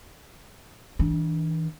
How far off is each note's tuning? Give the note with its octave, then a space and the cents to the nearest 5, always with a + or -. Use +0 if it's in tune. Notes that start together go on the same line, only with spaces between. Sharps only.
E3 -40 D4 +0